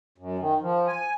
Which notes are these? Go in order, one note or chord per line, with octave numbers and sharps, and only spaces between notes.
F#2
D#3
F3
G#5